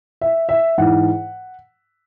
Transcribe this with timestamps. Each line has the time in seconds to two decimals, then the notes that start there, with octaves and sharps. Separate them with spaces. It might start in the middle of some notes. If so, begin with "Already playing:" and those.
0.21 E5
0.49 E5
0.78 G#2 E3 F#5